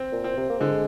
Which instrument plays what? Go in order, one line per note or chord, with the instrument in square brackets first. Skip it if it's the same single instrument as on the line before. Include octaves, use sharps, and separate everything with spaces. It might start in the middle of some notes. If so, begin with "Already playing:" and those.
Already playing: [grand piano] C4
[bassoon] A#2
[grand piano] C4
[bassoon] C3
A#3
[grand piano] D3 [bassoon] G#3